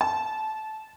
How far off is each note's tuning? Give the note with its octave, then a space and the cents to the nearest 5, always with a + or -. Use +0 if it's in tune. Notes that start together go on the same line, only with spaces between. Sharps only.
A5 -20